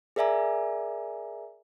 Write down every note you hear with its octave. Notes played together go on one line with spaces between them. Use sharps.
G#4 A#4 D5 E5 G#5 A#5